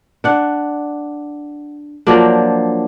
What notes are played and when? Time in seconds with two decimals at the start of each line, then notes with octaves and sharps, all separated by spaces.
0.24 D4 F#5
2.07 F3 F#3 A#3 D4